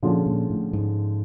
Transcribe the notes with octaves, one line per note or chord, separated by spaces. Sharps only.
A#2 D3 F3 G#3 C#4 F4
A#2
A2
G#2